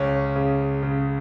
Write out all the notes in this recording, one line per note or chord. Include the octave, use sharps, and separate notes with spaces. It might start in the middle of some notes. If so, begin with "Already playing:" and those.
Already playing: C#2 C#4
C#3
C#3